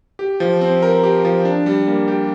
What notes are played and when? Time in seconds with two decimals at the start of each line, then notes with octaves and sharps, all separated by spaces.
0.19 G4
0.40 F3
0.61 C4
0.82 A#4
1.03 G4
1.25 F3
1.45 D4
1.66 G3
1.87 A#3
2.08 G4